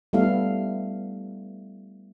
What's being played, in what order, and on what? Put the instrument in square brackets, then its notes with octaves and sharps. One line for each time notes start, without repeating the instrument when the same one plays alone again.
[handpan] G3 A3 B3 E4 A4 F5